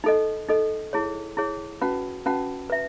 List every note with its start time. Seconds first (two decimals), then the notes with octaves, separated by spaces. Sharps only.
0.04 D#4 A4 D#5
0.48 D#4 A4 D#5
0.93 E4 G#4 C#5
1.37 E4 G#4 C#5
1.81 C#4 F#4 B4 F#5 A5
2.26 C#4 F#4 B4 F#5 A5
2.70 B4 E5